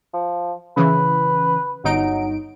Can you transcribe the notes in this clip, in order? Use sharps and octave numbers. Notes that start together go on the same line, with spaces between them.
F3
C#3 E3 B4
G1 F#3 D#4 D7